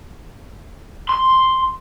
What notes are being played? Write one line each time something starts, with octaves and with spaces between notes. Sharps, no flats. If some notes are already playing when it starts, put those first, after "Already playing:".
C6